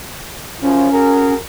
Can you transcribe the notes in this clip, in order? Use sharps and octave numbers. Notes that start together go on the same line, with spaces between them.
F#2 C#3 F3 C#4
F#4 G#4 A#4